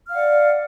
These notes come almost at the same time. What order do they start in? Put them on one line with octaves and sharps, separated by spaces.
F6 F5 F#5 D5